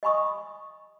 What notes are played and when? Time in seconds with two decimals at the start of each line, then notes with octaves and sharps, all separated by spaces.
0.03 D#5 G#5 B5 C#6 D#6